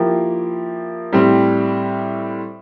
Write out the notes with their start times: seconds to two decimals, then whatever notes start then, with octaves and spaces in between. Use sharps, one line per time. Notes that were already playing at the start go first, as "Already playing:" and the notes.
Already playing: F3 A#3 E4 G4
1.13 A2 G3 C4 G4